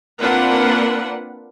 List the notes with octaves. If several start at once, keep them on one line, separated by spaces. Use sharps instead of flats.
A#3 C4 D4 F4 B4 F#5